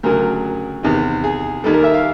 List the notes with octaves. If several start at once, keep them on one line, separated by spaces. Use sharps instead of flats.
D2 C#3 F#3 A#4
E2 C3 D#3
G#4
D#2 D#3 G3 A4
A#4
E5
F5